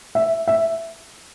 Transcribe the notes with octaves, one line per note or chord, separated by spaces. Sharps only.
E5
E5